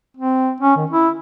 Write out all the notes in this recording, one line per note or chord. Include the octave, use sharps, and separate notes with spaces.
C4
C#4
D#3
E4